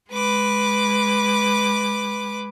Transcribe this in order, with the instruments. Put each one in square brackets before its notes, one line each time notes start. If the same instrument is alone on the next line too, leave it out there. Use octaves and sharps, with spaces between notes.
[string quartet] G#3 B4 D6